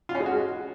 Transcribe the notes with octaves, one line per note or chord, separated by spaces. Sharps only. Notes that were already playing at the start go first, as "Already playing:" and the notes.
F4
C#4
G#3
F#4